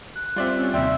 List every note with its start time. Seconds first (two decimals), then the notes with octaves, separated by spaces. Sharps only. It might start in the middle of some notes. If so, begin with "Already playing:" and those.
0.16 F#6
0.36 G3 C4 F4 D5 E5
0.56 C#4
0.74 D#2 C3 D5 E5 G5 C6 E6